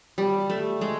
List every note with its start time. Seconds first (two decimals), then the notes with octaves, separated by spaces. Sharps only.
0.18 G3
0.50 A3
0.81 G#3